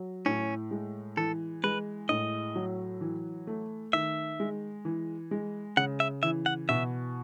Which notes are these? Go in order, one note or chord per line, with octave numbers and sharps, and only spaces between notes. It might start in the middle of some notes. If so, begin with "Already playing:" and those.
Already playing: F#3
A2 C#4
G#3
E3 A4
G#3 B4
A2 D#5
F#3
E3
A3
D#3 E5
G#3
E3
G#3
C#3 F#5
E5
E3 E5
F#5
B2 E5